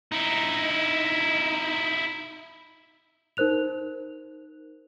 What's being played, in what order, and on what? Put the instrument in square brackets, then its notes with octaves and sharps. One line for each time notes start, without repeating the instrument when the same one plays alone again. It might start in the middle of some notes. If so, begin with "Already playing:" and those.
[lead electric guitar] D#4 E4
[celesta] D#4 A#4 C5 F#6 F7